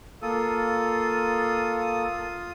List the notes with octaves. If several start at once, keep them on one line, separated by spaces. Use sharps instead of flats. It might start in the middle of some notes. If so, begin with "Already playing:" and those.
A#3 F4 A4 D#6